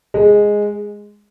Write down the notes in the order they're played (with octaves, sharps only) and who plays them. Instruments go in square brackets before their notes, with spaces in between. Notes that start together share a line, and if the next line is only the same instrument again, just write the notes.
[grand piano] G#3